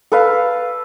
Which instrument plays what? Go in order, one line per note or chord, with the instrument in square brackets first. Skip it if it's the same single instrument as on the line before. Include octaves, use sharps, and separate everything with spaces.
[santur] A4 B4 F5